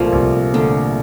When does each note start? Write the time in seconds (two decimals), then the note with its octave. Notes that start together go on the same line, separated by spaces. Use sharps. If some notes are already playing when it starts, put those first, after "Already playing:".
Already playing: C2 A#2 F3 A3 A#3
0.12 C2
0.53 A#2 D3 A3